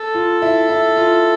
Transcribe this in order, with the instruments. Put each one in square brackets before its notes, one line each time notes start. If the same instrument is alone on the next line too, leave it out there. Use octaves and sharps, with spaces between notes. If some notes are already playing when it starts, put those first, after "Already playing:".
Already playing: [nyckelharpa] A4
[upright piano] F4
E4
E4
F4